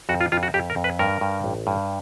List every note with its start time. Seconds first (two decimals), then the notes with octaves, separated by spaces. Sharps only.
0.09 F2 F#4
0.21 F4
0.32 F2 F4
0.43 F#4
0.54 F2 G4
0.70 A#4
0.76 F2
0.84 B4
0.99 G2 A#4
1.21 G2
1.44 A1
1.67 G2